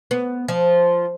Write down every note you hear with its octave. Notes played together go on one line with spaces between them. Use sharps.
B3
F3